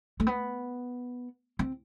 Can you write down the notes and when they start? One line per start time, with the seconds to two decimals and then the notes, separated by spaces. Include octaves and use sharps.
0.20 A3
0.27 B3
1.59 C4